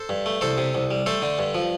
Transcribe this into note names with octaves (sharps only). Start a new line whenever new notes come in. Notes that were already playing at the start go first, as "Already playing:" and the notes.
Already playing: A4 C5
G2
A3
C2 A4 C5
C3
C2
G3
A3 A4 C5
D3
G2
F3